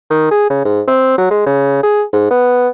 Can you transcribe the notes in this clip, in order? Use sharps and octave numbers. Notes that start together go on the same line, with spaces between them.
D#3
G#4
C#3
G#2
C4
F#3
G#3
C#3
G#4
G#2
B3